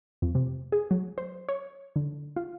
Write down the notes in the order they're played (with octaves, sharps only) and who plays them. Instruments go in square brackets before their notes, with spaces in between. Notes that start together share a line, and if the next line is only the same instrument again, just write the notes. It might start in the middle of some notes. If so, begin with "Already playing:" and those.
[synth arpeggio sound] F2
C3
G#4
F#3
C5
C#5
D3
F4